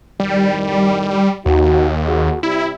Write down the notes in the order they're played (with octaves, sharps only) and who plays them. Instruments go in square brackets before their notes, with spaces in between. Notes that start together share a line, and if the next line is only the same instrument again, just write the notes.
[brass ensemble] F2 A2 D#3 [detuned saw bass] G3
[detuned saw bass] D#2 [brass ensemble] D#4 F#4
[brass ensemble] F#4 G#4
[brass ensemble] C3 G3 [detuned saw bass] E4